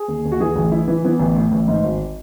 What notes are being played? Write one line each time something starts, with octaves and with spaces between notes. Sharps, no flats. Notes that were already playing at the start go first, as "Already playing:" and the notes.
Already playing: G#4
D#2
D#2
F#4
E3 G#4
A1
E3 E4
E3
E3 B3
A1
A2
A1
G#2
G#1